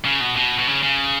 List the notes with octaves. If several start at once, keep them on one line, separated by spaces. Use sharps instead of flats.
C#3
B2
B2
B2
C#3
C#3